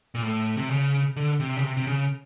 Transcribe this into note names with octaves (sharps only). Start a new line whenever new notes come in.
A#2
A2
C3
C#3
D3
C3
C#3
C3
C3
C#3